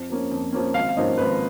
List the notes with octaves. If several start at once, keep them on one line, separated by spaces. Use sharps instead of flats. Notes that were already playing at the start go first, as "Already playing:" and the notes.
Already playing: F2
F3 A#3 C#4
F2
F3 A#3 C#4
G#1 F5
F5
G#2 F3 A#3 C#4 D#5
G#1 B4